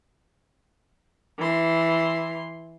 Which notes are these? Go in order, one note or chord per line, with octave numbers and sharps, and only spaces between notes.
E3 C6